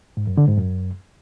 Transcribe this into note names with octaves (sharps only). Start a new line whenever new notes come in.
G#2
F#2
D3
G#2
F#2